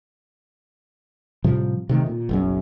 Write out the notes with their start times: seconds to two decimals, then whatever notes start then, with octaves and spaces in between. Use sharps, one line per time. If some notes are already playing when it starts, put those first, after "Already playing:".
1.44 A2 C3 F3 G3
1.89 C3 D#3 A3
2.06 A#2
2.29 F#1 B1 F#2